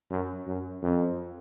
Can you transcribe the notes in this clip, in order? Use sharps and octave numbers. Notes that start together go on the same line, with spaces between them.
F#2
F#2
F2